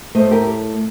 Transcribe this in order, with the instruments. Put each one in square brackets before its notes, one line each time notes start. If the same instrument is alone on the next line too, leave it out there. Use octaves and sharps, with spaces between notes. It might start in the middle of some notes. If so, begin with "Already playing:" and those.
[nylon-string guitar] A2 A3 C5 D#5
G4 A#4